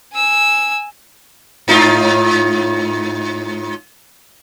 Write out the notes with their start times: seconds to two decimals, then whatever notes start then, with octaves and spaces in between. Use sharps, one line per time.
0.13 G#5 E6
1.68 G#2 D#4 F4